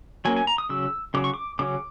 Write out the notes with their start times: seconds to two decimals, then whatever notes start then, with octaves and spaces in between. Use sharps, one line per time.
0.25 F#3 A#3 C#4 G#5
0.36 G#5
0.47 A#5
0.58 D#6
0.69 C#3 F#3 E6
1.14 C#3 F#3 D6
1.24 C#6
1.34 D6
1.59 C#3 F#3 C#4 D6